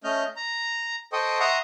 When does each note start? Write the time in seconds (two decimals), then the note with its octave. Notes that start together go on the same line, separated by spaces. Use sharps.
0.04 A3 C#4 D#5 F6 G6
0.36 A#5
1.13 A4 C5 D#5 G5 C#6 D#6
1.40 E5 F#5 A#5 C6 C#6 D#6